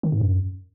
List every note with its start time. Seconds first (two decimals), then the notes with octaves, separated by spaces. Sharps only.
0.03 D#3
0.12 G#2
0.21 F#2